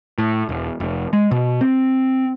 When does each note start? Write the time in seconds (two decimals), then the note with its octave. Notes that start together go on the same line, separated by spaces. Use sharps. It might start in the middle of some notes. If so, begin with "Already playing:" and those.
0.18 A2
0.49 E1
0.80 F1
1.13 G#3
1.31 B2
1.61 C4